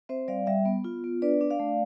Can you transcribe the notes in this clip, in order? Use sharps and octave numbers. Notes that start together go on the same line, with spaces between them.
C4 C5 E5
G3 D5 F5
G3 E5 G5
B3
F4
B3
D4 B4 D5
D4
D5 F5
A3